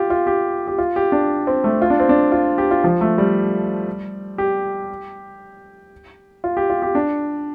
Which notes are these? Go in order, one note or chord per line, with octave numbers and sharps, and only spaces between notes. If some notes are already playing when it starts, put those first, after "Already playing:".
Already playing: F4 G4
F4
G4
G4
F4
G4
D4
C4
A3
F4
D4
C4
D4
F4
G4
F4
F3
A3
G3
G4
F4
G4
F4
G4
D4